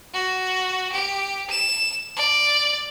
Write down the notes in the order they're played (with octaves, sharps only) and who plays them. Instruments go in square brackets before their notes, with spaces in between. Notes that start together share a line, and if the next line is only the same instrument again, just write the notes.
[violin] F#4
G4
E7
D5